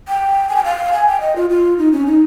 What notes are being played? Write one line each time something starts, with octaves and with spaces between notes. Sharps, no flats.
G5
G#5
G5
F5
G#5
G5
D#5
F4
F4
D#4
C#4
D#4